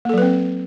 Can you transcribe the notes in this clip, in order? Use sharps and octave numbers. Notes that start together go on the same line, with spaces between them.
F#3 A#3 C4 A4 B4